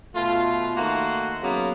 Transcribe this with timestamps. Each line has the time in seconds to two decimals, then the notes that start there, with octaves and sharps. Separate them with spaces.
0.15 B2 A3 F4
0.77 D#3 A3 A#3 F#4 C6
1.42 C#3 F#3 A#3 B3